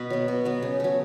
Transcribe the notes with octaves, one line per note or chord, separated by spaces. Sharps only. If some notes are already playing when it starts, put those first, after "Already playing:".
Already playing: B2 B4
F#3 B3
B2
F#3 B3
C#3
F#3 A3